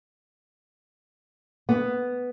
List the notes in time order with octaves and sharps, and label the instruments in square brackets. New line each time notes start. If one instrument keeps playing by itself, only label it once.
[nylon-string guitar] B3